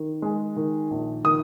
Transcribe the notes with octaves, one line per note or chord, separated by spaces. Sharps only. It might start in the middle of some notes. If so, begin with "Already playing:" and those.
Already playing: D#3
G#3
D#3
A#1
D#3 D#6